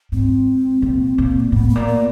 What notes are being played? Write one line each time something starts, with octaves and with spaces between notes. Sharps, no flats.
G#2 C4
A#2
A#2
A#3
A2 B3
A#3
A#2
B3